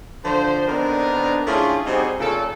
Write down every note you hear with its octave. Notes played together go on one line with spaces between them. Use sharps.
D3 F3 C5
D3 B3 C4 D4 D#4 A#4
D3 A3 C#4 E4 F4 G#4
C3 G3 C4 D#4 F#4 G#4
A#2 C#3 A4